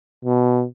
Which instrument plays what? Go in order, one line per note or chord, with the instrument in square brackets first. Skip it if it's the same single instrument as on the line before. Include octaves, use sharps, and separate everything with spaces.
[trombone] B2